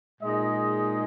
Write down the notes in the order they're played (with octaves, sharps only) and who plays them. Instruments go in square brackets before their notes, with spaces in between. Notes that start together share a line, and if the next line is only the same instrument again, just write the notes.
[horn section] A#2 G#3 D#4 G#4 D#5